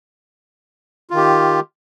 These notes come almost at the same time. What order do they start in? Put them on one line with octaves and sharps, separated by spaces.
F4 D#3 G4